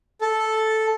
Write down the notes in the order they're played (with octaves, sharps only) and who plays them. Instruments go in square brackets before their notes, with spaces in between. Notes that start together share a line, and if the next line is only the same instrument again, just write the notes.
[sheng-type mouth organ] A4